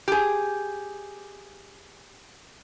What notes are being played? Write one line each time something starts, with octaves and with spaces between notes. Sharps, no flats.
G4 G#4